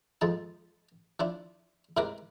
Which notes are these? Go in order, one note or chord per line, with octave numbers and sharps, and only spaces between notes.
F2 G#2 F3 A5
F3 D4 E4
G#2 C3 E4 A#4 B4 D6